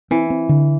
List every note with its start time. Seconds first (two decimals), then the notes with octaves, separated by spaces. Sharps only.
0.11 E3 C4
0.30 C4
0.49 D3